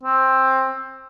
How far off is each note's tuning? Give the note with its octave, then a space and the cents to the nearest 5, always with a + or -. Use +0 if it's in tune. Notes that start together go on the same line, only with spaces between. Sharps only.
C4 +15